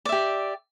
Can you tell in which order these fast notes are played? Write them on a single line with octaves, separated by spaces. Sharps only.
D5 E5 G4